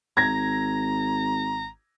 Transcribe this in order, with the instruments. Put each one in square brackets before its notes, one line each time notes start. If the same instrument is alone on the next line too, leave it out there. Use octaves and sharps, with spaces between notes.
[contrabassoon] G#1 [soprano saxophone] A#5 [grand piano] G#6 A#6